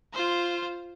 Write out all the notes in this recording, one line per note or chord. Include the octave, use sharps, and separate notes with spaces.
F4 C5